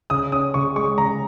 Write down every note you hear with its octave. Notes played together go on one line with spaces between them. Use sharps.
C#3 D#6
C#4 D#6
C#3 C#6
G#3 C#6
C#3 A#5